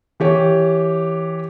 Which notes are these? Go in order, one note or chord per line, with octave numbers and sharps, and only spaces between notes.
E3 G4 C#5